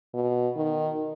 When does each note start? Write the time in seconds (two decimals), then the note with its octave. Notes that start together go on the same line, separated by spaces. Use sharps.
0.14 B2
0.56 D#3